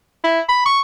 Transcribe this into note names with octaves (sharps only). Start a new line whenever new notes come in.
E4
B5
C#6